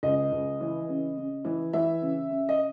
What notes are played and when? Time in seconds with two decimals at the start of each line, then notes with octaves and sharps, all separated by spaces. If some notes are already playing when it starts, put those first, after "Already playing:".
0.03 C#2 D#5
0.32 C#2
0.61 E3
0.89 C#3
1.17 C#3
1.45 E3
1.73 E3 E5
2.02 C#3
2.31 C#3
2.49 D#5